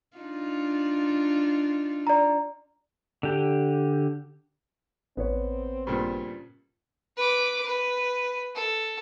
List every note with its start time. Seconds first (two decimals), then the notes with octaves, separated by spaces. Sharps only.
0.17 D4 D#4 F4
2.07 D5 A#5
3.23 D3 G4
5.17 A1 B3 C4 B4 C#5
5.87 G2 A#2 C#3
7.17 B4 D6
7.66 B4
8.55 A4